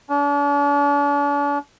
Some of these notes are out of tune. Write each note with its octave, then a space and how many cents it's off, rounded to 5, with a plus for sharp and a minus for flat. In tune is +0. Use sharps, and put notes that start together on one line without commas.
D4 -45